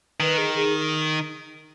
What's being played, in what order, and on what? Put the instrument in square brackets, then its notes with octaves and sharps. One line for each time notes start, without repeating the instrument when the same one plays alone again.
[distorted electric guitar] D#3 [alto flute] B4
[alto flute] G#4
G#4